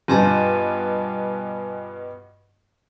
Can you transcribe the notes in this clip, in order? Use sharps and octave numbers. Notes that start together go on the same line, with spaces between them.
G2 B2 F4 G#5 A5